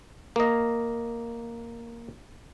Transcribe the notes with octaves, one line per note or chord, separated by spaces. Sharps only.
A#3 D#5